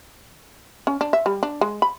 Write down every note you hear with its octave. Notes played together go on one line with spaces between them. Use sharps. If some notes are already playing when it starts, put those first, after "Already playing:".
C#4
D4
E5
G3
D4
G#3
B5